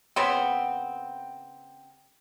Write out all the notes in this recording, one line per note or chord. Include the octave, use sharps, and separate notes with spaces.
C#3 B3 C4